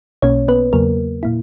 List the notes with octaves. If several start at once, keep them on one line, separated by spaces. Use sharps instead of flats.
B1 B2 A#3 C#4 C#5
B3 B4
E2 C#3 F#3 A#3 A#4
A#2 A#3 E4